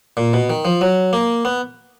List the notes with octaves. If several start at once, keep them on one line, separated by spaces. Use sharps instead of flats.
A#2
B2
D#3
F3
F#3
A#3
B3